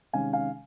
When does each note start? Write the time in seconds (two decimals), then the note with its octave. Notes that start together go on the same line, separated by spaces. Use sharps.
0.13 C3 D#3 G#3 C#4 F5 G#5
0.33 F5 G#5